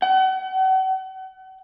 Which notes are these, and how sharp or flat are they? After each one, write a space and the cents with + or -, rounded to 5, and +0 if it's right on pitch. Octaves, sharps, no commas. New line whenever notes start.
F#5 +40